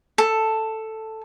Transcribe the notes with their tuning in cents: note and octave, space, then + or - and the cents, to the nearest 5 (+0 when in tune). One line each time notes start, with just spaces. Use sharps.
A4 +5